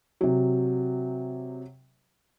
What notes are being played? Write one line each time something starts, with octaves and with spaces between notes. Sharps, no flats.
C3 F#3